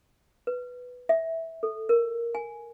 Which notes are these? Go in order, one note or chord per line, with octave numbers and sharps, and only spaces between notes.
B4
E5
A4
A#4
G#5